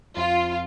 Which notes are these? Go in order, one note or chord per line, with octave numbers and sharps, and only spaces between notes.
F2 F4